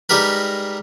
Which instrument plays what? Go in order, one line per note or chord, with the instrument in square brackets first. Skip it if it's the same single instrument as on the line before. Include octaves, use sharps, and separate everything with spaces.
[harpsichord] G3 G#3 D#4 G4 A#4 B4